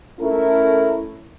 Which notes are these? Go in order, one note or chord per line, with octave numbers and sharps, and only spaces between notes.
A3 C#4 E4 A4 A#4